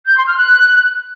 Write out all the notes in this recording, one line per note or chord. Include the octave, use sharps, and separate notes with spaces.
G6
C6
F6
F#6